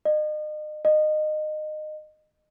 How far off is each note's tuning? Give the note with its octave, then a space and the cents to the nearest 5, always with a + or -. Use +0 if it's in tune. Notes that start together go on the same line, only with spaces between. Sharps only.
D#5 -35
D#5 -20